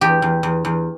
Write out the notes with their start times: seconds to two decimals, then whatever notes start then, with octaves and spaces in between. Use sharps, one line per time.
0.01 E2 G4
0.22 E2
0.43 E2
0.65 E2